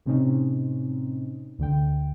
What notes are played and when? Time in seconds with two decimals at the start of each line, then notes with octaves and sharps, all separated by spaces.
0.06 A2 C3 C4 C#4 D#4
1.59 D2 D3 G5